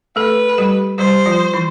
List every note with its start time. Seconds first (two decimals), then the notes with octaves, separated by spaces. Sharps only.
0.16 A3 A4 B4
0.49 A4
0.58 G3 G4
0.98 G3 G4 C5
1.26 F3 F4
1.54 E3 E4